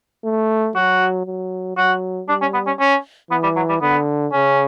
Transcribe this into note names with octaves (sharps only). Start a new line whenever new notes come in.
A3
F#3 F#4
F#3
F#3 F#4
G3 D4
C#4
B3
C#4
C#4
E3 B3
G3
F#3
G3
D3 B3
C#3 C#4